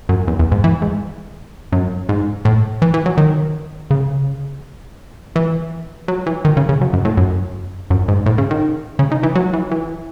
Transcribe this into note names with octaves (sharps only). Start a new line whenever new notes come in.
F#2
E2
E2
G#2
E3
G#2
F#2
G#2
A2
E3
E3
F#3
D#3
C#3
E3
F#3
E3
D#3
C#3
C#3
F#2
F#2
A2
F#2
F#2
G#2
A2
C#3
D#3
C#3
D#3
E3
F#3
E3
E3